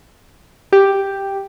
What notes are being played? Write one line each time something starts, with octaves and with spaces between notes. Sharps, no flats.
G4